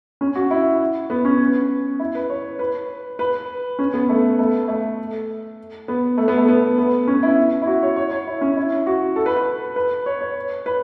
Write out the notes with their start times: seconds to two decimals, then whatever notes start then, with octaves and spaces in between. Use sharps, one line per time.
0.21 C#4
0.36 F#4
0.51 E4
1.10 B3
1.25 C#4
2.00 E4
2.15 B4
2.30 C#5
2.59 B4
3.19 B4
3.79 C#4
3.94 B3
4.09 A3
4.39 A3
4.68 A3
5.88 B3
6.18 A3
6.28 B3
6.38 A3
6.48 B3
6.78 B3
7.08 C#4
7.23 E4
7.62 E4
7.67 F#4
7.83 C#5
7.96 C#5
8.11 C#5
8.28 E4
8.41 C#4
8.57 E4
8.87 F#4
9.16 A4
9.26 B4
9.36 B4
9.76 B4
10.06 C#5
10.21 C#5
10.66 B4